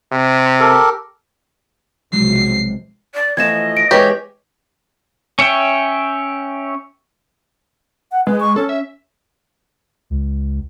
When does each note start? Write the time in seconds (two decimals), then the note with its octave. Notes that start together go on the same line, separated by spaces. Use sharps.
0.12 C3
0.60 G4 A4 A#4
2.13 B1 C3 F3 F#3 G#3 C7
3.15 D5
3.37 E3 F3 A3 D#5 G#6 E7
3.77 D7
3.91 E3 G#3 G4 B4 C#5
5.39 C#4 C#5 E5 G5
8.12 F#5
8.27 G#3 B4
8.40 C#6
8.56 C#4 A4
8.69 E5
10.10 C#2